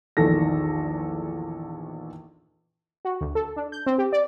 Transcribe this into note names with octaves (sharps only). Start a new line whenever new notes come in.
A#1 E2 D#3 A4 A#6
F#4
D2
A4
D4
G6
C4
G4
D5